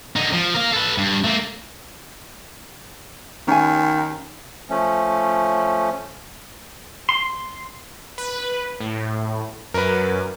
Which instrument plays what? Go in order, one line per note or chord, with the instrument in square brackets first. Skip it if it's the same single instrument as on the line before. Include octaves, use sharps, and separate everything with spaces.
[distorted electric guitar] D3 D#4
F3
A#4 F5
A4 B4
G2
A3 A#3
[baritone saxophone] D#3 [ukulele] C#4 G#5
[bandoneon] F3 A3 C#4
[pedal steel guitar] C6
[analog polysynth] B4
A2
[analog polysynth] F#2 [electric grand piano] A#4 B4